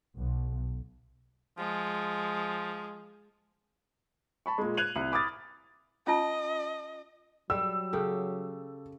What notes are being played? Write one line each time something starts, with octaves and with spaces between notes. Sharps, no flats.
B1
F3 G#3
A5 B5 C#6
A#2 G#3
F#6 G#6 D#7 F7 F#7
C2
B5 D6 D#6 F6 A6
C#4 F4 D#5 A5
F#3 G3 E6
C#3 G4 A4